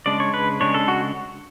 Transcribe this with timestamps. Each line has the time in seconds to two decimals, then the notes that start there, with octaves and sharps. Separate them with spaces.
0.06 C#3 G#3 D4 D5
0.20 C#5
0.34 B4
0.60 C#3 G#3 D4 C#5
0.74 A4
0.88 F#4